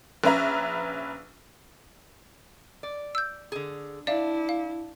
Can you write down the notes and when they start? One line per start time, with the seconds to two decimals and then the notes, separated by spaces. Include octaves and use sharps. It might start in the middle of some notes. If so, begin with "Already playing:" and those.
0.24 A#1 C#4 B4 E5 A#5
2.83 D5
3.15 E6 G6
3.52 D3 G#4
4.07 D4 E4 D5 E5 F5
4.49 F5